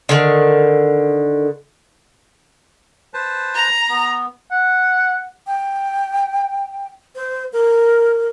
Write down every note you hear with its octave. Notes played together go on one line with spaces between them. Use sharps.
D3 D#3
B4 C5 A5
A#5
B3
F#5
G5
C5
A#4